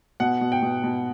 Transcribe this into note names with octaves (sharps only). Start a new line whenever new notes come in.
B2 F#5
B2
G5
B2
B2